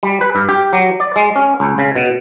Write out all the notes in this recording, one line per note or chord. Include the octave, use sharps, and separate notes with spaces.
G3
B4
G2
G4
F#3
D5
G#3
C#4
C#2
C#3
B2